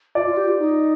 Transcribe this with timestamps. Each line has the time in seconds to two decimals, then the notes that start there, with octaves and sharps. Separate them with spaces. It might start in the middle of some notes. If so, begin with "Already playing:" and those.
0.15 F4 D5
0.26 F4
0.37 G4
0.48 F4
0.59 D#4